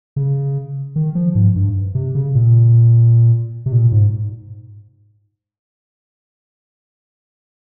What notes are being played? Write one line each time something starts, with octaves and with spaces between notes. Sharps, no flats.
C#3
D#3
F3
G#2
G2
C3
C#3
A#2
C3
A#2
G#2